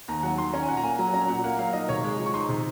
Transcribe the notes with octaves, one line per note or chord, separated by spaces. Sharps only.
D#2 A#5
F#3 F#5
D#3 C6
C#4 A#5
G#5
A#2 F#5
A#5
A#3 G#5
F#3 A#5
C#4 A#5
A#2 F#5
A#3 F#5
F#3 F5
D#4 D#5
C3 C#5
G#3
F3
C#6
D#4 C6
C3